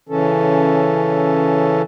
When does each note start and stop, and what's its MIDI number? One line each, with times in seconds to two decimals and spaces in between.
0.09 1.82 49
0.09 1.82 52
0.09 1.82 61
0.09 1.82 69